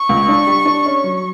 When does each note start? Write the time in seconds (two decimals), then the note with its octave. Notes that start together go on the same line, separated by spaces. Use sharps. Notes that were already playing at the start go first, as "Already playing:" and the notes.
Already playing: C#6
0.09 C#2
0.28 D4
0.47 G3
0.65 D4
0.86 C#4
1.04 F#3